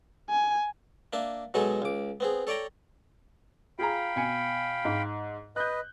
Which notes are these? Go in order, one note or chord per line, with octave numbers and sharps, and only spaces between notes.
G#5
A#3 D4 E5
B2 F#3 G#3 D#4 A4 G#5
C#2 D6
B3 C4 G#4
A4 C#5 D5 G5 A#5
F4 G#4 F5 G5 A#5 B5
B2 G#5 C#7
G#2
B4 D#5 F#6 G6